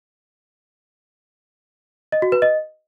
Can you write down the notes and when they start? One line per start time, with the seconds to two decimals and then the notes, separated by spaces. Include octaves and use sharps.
2.12 D#5
2.22 F#4
2.32 B4
2.42 D#5